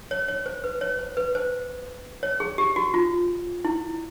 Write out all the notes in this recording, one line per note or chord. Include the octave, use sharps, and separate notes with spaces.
C#5
C#5
C5
B4
C#5
C5
B4
C5
C#5
G#4
G4
F#4
F4
E4